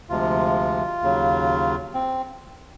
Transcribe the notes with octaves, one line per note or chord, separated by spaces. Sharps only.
D2 C3 F3 G#3 F4
D#2 C#3 F#3
C4